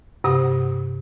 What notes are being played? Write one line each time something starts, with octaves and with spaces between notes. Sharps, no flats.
G2 C3 F#5 D#6